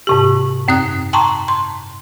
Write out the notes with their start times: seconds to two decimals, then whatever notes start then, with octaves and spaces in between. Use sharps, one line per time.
0.07 G#2 C3 G4
0.68 F#2 C4 D#6 F#6
1.13 G5 A5 A#5 C6 C#6
1.48 C6